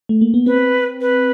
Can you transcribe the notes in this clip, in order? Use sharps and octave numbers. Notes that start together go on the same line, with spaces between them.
A3
A#3
B3
C4 B4
B4